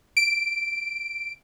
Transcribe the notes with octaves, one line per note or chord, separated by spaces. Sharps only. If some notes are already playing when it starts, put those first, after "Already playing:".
D7